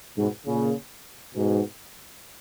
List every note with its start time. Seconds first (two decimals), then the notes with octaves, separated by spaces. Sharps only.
0.18 G#2 B2
0.46 A#2 C#3
1.35 G#2 B2